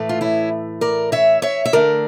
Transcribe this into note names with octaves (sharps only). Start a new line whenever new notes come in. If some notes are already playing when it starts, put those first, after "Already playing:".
Already playing: A2 E3 A3
F4
C#4 E4
A#4 D5
C#5 E5
C#5 E5
E5
D3 A3 A#4 D5